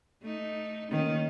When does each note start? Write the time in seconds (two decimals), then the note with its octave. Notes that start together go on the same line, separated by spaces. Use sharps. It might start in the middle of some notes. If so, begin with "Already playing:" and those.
0.22 A3 D#4
0.91 D#3 A#3 C#4